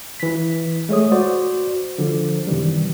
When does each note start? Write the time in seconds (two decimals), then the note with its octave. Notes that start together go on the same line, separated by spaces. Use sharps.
0.20 E3 B6
0.89 G#3 A3 C#5 D#6
1.12 F#4 C5 D5
1.98 D3 F3
2.47 F#2 C3 D#3 E3 G3